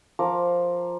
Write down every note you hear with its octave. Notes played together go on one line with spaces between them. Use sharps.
F3 A#4 D6